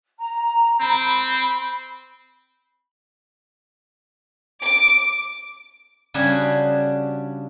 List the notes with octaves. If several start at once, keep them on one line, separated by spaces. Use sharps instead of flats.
A#5
C4 B5
D6
C#3 G3 D4 F#4 G#4